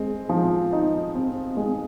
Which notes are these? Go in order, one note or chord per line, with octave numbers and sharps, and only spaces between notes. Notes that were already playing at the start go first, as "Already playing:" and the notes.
Already playing: G#3 C4
F3
D#4
C4
G#3